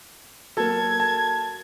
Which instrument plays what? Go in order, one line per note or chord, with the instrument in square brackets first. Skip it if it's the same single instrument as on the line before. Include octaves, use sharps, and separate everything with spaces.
[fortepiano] F#3 A#3 [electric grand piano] A4 A5 [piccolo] G#6
[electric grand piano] A5